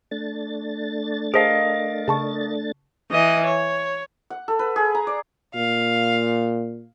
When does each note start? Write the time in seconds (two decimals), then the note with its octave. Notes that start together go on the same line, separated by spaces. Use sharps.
0.11 A3 D4 A6
1.34 G#4 A#4 C5 D#5 F5 A5
2.08 C#3 A5 C#6
3.11 E3 D#5
3.46 C#5
4.30 F#5
4.48 A4
4.59 B4
4.76 G#4
4.95 A#5
5.07 D5
5.55 A#2 F5